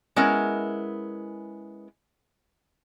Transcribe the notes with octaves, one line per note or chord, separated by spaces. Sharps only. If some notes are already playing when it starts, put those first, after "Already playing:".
G#3 B3 C#4 E4 A#4